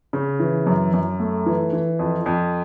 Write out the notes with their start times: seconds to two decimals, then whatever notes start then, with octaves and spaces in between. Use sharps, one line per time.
0.13 C#3
0.40 E3
0.67 F#2
0.93 F#2
1.20 A3
1.46 E3
1.73 E3
1.99 F2
2.26 F2